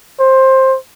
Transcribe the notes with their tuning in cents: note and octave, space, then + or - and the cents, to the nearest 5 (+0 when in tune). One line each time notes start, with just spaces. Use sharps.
C5 +15